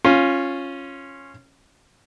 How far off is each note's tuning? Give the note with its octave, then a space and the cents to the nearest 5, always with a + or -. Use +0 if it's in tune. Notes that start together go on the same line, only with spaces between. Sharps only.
C#4 -10 F4 +0